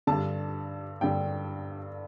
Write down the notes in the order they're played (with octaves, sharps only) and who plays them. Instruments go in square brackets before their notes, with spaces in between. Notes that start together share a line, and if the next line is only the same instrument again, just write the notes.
[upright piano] G2 D3 A5
G2 D3 G5